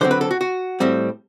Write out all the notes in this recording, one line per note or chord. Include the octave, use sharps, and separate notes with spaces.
D3 F#3 C4 C5
B4
A4
F#4
F#4
A2 G3 C4